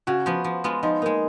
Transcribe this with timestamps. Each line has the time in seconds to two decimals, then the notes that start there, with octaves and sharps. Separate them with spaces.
0.07 C#3 F#4
0.26 F3 B3
0.44 F3
0.64 G#3 B3 F4
0.83 F3 D#4
1.02 G#3 A#3 D#4